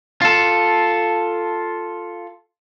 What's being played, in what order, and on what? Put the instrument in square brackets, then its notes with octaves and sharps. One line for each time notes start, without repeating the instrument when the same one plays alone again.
[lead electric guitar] F4 A4